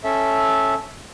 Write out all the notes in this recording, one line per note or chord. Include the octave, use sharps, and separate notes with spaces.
C#4 A4 E5